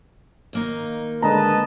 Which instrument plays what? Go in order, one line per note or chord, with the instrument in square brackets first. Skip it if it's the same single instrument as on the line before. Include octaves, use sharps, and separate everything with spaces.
[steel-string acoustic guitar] D#2 A#3 D#4
[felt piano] D3 G#3 A#5 [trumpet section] B4 D#5 A5